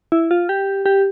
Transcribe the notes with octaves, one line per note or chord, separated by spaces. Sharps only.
E4
F4
G4
G4